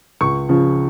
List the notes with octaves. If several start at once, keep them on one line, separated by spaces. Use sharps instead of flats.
C#2 C#6
C#3 F3